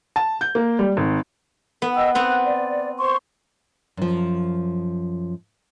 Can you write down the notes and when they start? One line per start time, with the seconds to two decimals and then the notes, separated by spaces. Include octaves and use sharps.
0.16 A5
0.41 G6
0.55 A#3
0.79 G3
0.97 G#1
1.82 B3
1.94 D#5 G5 E6
2.15 B3 C4 F#6
2.44 D5
2.99 C5 C6 C#6
3.97 F#2 F3